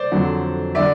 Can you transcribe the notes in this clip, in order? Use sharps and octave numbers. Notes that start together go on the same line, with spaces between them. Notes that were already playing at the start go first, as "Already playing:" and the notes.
Already playing: C5 D5
F2 D3 F#3
D3 F#3 D5 E5